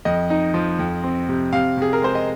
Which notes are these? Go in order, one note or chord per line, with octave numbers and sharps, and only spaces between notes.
F2 D#5
D#4
F3
F2
C4
C3
C3 F5
C3 G#4
A#4
G#3 C5
D#5